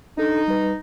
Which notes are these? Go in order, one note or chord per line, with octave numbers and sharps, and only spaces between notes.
D4 D#4 A4
G3 B4